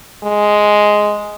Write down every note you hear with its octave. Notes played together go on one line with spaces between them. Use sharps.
G#3